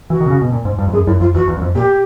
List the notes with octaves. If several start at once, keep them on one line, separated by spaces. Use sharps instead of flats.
E3 F#4
D#3
C3
C#3
B2
A#2
G#2
G2
F2
F#2 G#4
F#2 E4
F2 F4
E2 F#4
E2
F#2
F2
A#2 G4